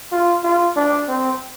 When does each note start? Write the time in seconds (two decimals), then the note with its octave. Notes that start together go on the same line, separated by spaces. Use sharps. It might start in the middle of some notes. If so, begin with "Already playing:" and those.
0.12 F4
0.44 F4
0.76 D4
1.08 C4